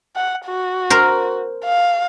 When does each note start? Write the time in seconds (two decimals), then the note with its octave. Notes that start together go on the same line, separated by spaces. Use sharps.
0.16 F#5
0.46 F#4
0.90 A#4 C5
1.65 F5